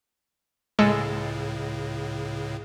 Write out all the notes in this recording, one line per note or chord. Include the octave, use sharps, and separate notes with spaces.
C#2 A2 C#3 G#3 A4